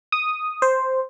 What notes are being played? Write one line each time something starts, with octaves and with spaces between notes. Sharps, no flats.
D#6
C5